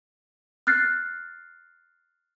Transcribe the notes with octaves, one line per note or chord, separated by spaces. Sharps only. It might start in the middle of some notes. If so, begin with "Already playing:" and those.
F6 F#6 A6 C7